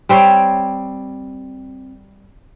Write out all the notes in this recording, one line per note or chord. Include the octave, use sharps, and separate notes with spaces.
G3 C4 C5 C#5